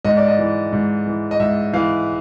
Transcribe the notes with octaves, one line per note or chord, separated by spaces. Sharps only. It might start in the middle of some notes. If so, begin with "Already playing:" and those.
G#2 D#5
D5
D#5
E3
G#2
E3
D#5
G#2 E5
E3 F5